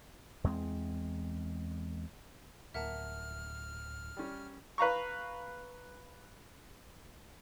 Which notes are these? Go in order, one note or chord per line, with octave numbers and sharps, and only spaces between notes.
E2 G#3 C4
D1 A#3 E5 F#5 A5 F6
G3 C#4
B4 F5 A#5 C#6